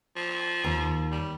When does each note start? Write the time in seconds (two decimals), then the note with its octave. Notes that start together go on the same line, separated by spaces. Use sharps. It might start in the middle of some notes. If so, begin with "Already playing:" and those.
0.16 F3
0.64 D#2
1.11 G3